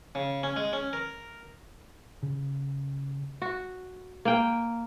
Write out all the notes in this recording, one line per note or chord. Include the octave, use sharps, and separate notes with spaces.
C#3
C#4
G#3
C#4
A#4
C#3
F#4
A#3 G5